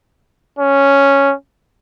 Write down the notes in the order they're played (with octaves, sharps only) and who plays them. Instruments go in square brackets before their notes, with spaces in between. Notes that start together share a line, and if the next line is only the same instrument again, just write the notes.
[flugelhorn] C#4